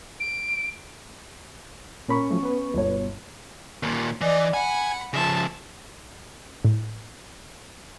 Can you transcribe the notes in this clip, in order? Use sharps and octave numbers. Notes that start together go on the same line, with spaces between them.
D7
A#2 C#4 A#4 B5 C#6
F3 F#3 A3
B3 B4
G1 B2 C#5
D#2 A#2
E3 D5 D#5
F#5 G#5 B5
C#3 F3 E5 A5
A2